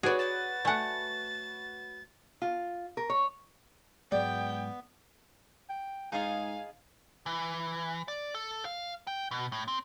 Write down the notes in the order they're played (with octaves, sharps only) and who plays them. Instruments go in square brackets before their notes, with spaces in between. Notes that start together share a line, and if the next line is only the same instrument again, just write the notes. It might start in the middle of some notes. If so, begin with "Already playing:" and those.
[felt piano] F#4 B4 C#5 [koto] G#4 D5
[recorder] A6
[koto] A3 F#5 [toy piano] D5 G#5
[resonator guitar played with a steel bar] F4
A#4
C#5
[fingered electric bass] G#2 F#3 G#3 [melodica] B3 [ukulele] D5 [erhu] G5
[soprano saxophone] G5
[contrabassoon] G#2 [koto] D#4 F4 G#4 [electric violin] F5 [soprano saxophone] G#5
[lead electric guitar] E3
D5
A4
F5
G5
B2
A2
C4